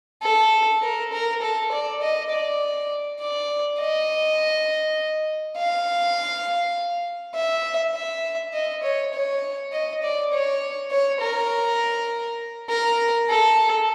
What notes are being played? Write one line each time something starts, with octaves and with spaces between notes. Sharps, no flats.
A4
A#4
A#4
A4
D5
D#5
D5
D5
D#5
F5
E5
E5
D#5
C#5
C#5
D#5
D5
C#5
C#5
A#4
A#4
A4